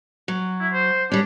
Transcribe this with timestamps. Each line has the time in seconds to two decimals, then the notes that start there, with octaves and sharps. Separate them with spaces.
0.28 F#3
0.60 E4
0.73 C5
1.12 G3 C#4 D4